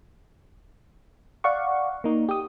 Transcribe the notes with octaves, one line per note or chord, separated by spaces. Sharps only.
D5 F5 F#5 C#6
A#3 D#4
G4 D#6